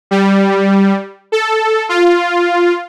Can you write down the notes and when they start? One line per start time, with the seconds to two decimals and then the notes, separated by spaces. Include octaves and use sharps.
0.11 G3
1.32 A4
1.89 F4